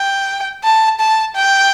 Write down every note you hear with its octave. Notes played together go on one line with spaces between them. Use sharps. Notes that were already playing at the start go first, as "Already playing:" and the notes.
Already playing: G5
A5
A5
G5